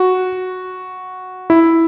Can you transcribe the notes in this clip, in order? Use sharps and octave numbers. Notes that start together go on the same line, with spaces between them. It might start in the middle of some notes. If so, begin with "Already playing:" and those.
Already playing: F#4
E4